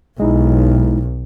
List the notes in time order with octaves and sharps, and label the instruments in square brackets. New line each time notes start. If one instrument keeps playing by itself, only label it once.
[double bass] B1 [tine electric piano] G#3 D#4 E4